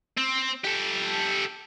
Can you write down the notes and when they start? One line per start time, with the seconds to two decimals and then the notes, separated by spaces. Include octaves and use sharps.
0.18 C4
0.65 G4 A4